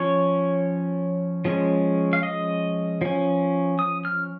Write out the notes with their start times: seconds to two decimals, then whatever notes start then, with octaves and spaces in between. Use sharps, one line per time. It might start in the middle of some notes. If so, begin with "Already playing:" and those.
Already playing: F3 C#4 C#5
1.45 F3 G#3 C#4
2.13 F5
2.23 D#5
3.01 F3 C#4
3.79 D#6
4.05 F6